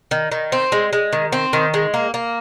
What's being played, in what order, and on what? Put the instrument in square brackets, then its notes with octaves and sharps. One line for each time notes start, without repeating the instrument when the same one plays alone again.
[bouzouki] D#3
D#3
C4
G#3
G#3
D#3
C4
D#3
G#3
A#3
A#3